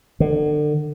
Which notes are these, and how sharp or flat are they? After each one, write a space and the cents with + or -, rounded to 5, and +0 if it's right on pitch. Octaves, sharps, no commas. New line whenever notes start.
D3 +30